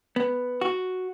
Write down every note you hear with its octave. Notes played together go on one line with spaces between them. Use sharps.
B3
F#4